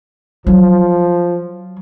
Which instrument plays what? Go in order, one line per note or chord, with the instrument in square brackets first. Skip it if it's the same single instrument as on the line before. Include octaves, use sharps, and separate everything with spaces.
[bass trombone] F3 [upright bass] F#3